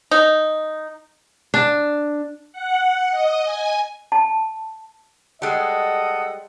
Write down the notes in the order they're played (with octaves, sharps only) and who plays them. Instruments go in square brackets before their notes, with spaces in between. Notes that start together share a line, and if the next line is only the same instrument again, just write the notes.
[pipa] D#4
[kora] D4
[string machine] F#5
D#5
G#5
[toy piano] A5
[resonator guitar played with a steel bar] G3 G#3 [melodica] A4 [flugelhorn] D#5 [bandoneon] F#5